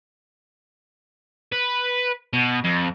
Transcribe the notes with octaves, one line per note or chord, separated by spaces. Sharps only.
B4
B2
F2